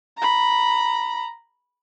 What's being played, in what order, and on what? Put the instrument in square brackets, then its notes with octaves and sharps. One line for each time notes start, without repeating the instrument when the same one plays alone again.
[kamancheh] A#5 B5